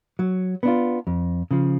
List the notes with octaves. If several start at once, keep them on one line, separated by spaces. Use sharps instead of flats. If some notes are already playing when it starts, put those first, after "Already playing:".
F#3
B3 D4 F4
F2
C#3 F3